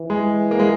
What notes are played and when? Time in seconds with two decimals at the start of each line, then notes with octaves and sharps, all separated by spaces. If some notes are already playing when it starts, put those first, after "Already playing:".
Already playing: E3
0.10 G#3
0.51 A#3
0.59 G#3